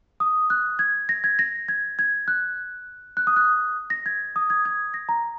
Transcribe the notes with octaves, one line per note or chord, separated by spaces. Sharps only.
D#6
F#6
G#6
A#6
G#6
A#6
G#6
G#6
F#6
F#6
D#6
F#6
A#6
G#6
D#6
G#6
G#6
A#6
A#5